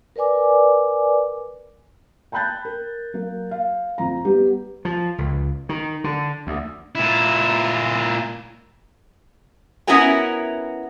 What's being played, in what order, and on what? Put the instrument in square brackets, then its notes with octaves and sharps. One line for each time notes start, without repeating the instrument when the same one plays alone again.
[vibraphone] A#4 B4 D5 G#5 D6
[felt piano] G5 A5 B5 F#6 G6 A6
A#4
F#3 A#3
F5
F2 A#5
G3 B3 G4
[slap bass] F3
C#2
D#3
D3
D2
[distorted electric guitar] A#2 E4
[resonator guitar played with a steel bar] B3 C#4 E4 F#4 A#4 G#5